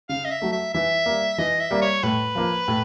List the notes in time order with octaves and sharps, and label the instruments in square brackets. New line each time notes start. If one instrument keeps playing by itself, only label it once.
[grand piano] C#3 [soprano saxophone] F5
[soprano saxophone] D#5
E5
[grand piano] F#3 A3
[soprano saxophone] E5
[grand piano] E3 [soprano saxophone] E5
[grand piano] G3 A#3
[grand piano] E3 [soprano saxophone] D#5
[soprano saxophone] E5
[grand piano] G3 A#3
[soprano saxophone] C#5
[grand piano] A2 [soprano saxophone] B4
[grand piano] F3 A#3
A2